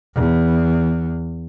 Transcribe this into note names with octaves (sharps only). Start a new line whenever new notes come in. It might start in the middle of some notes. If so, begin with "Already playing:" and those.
E2